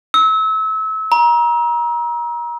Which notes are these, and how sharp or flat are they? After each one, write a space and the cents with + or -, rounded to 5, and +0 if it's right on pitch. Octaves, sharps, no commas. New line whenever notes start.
E6 -30
A#5 +30